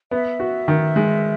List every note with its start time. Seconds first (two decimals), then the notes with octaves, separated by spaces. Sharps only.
0.11 B3 E5
0.40 F#4
0.68 D#3
0.96 G#3